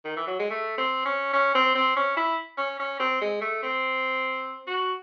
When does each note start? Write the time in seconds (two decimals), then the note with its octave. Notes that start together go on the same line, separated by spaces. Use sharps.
0.05 D#3
0.16 E3
0.27 F#3
0.39 G#3
0.50 A3
0.78 C4
1.05 C#4
1.33 C#4
1.55 C4
1.75 C4
1.96 C#4
2.17 E4
2.58 C#4
2.79 C#4
3.00 C4
3.21 G#3
3.41 A3
3.63 C4
4.67 F#4